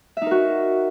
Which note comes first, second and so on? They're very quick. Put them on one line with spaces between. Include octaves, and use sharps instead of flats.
E5 D#4 A#4 F#4